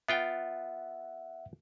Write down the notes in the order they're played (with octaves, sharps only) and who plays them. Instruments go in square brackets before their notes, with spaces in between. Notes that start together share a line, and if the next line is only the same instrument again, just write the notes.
[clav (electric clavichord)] B3 F4 G5 [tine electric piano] E5 F#5